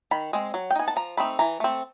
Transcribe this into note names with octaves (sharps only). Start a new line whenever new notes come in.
D#3 B5
G#3 C4
F#3
G5
B3 D#4 G#5
A5
F3 A#5
A3 C4 D#4 B5
E3 A#5
A3 C4